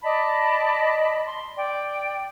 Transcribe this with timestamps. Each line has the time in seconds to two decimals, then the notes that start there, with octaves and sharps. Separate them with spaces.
0.03 D5 D#5 A5 B5
1.26 C6
1.56 D5 G5